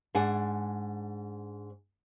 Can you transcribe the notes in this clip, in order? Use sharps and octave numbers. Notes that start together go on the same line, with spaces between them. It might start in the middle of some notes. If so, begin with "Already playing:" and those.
G#2 D4 F#5 G#5